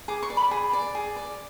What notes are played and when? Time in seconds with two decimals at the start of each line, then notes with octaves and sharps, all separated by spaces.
0.08 G#4 D6
0.23 C#6
0.30 D5
0.37 B5
0.51 G#4
0.73 D5
0.95 G#4
1.16 D5